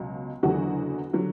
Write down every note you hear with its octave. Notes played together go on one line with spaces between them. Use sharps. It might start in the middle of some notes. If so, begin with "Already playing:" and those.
Already playing: C#2 B2 F#3
F#1 E2 D3 F#3 F#4
D3 F#3